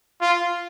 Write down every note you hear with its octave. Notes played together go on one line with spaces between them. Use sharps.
F4